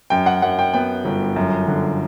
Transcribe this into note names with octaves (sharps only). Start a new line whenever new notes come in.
F#2 G5
F#5
F#2 F#5
G5
B3 G5
G1
F#2
D3